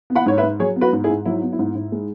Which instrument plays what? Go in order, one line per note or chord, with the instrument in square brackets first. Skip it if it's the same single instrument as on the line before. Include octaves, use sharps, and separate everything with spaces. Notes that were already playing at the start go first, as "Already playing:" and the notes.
[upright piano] B3
F#5 B5
G#2 C#5
B4 E5
G#2
F#3 G#4 C#5
B3
F#4 B4
G#2
E4 G#4
G#2
F#3 E4
B3
E4
G#2
G#2
G#3